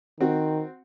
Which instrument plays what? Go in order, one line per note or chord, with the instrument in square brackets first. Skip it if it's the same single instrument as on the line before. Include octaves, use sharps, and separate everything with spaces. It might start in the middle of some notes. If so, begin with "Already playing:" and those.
[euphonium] D#3 [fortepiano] C4 F#4